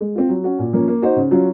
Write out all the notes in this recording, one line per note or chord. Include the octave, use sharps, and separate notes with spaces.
G#3
C4 F4
F#3
C#4 F#4
A#2
F3 A#3 C#4
A#3
D#4 F#4 C5
C#3
F#3 C#4 F4